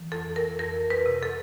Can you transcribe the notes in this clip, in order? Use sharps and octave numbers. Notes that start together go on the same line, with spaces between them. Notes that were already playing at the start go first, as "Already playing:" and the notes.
Already playing: E3
F2 A4
A#4
F2 A#4
B4
C3
A4